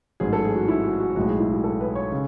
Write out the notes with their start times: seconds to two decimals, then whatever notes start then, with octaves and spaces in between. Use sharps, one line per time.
0.20 A1 G#2 F#3 G#4
0.33 A4
0.44 G#4
0.56 F#4
0.68 E4
0.84 F#4
1.00 F#4
1.16 B1 A2 G#3 F#4
1.28 G#4
1.40 E4
1.52 F#4
1.64 A4
1.81 B4
1.95 C#5
2.12 C#3